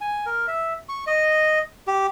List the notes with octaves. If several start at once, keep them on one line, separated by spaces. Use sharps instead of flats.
G#5
A#4
E5
C#6
D#5
G4